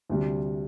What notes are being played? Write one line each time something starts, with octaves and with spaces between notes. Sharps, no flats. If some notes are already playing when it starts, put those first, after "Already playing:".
D2 C3 G3